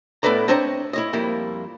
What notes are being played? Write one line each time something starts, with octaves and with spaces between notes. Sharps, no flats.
A2 B3 A4 B4 D5 A#5
C4 D4 C5 C#5 D#5 A#5
E4 C#5 D#5
F2 G3 A#3 E4